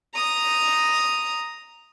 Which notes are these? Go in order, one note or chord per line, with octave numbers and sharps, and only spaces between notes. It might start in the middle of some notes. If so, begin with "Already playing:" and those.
A#5 D#6